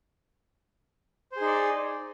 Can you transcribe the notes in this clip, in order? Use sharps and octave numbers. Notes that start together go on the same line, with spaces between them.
D#4 G#4 C5 D5